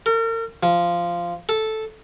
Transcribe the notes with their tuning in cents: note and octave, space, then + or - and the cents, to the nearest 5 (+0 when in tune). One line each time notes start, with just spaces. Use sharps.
A#4 -40
F3 -10
A4 -5